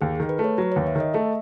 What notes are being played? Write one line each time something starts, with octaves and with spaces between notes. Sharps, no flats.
D#2 G#4
D#3 G#4
B4
A3
C#5
F#3 B4
D#2 C#5
E5
D#3 D#5
A3 E5